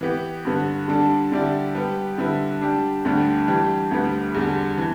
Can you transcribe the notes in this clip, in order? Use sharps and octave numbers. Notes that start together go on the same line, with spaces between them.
E3 B3 G4
G2 D3 B3
D3 G3 D4 A4
D3 G3 E4 G4 D5
G3 B3 G4 B4
D3 G3 E4 B4
G3 D4 G4
D2 D3 G3 D4 G4
E3 G3 D4 G4
D2 D3 G3 B3
E2 D3 G3
E3